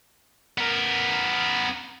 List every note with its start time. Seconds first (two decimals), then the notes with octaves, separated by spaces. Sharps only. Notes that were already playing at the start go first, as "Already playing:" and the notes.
0.58 B3 A#4